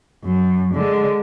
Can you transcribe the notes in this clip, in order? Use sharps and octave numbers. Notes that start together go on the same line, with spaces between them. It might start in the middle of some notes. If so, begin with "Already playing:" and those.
F#2
D3 G#3